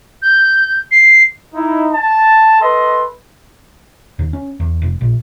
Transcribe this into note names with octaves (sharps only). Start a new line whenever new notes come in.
G6
C7
D#4 E4
A5
A4 B4 D#5 C6
D#2
C#4
E2
F1
A#1